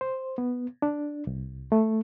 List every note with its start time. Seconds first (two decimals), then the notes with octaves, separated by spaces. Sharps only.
0.01 C5
0.38 B3
0.82 D4
1.27 C2
1.72 A3